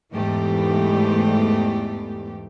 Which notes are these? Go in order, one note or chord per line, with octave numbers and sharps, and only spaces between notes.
E2 G#2 E3 A3 G4